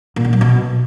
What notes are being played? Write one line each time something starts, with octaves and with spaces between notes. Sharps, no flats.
A#2
D3
F#3
B2